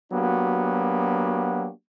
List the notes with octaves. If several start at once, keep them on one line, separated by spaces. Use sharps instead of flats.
F#3 A#3 B3 D4 F#4 G4